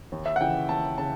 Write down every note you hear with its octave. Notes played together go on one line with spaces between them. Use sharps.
D#2
E5
F#5
C#3 E3 G5
D#2 A5
C#3 A5